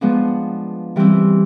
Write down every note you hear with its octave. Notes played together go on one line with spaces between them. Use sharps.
F3 G#3 B3 D4
E3 G3 C4 E4